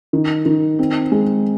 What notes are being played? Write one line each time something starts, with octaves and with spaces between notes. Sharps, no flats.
D#3
D#3
C4
G#3